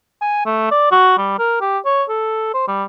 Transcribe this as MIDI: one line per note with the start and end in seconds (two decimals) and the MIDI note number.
0.22 0.45 80
0.46 0.69 57
0.71 0.88 74
0.92 1.16 66
1.18 1.34 55
1.39 1.58 70
1.61 1.78 67
1.85 2.04 73
2.09 2.49 69
2.54 2.67 72
2.68 2.84 55